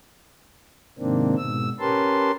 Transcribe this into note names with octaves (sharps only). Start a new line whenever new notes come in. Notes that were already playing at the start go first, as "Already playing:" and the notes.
G#2 C3 D#3 A#3 C4 D4
G#2 B2 E6
C#4 G4 A#4 B4 A5 C6